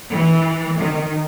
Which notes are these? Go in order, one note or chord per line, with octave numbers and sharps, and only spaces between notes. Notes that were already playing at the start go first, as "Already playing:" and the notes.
E3
D#3